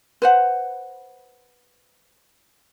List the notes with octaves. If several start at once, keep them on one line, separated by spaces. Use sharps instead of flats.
B4 C5 F#5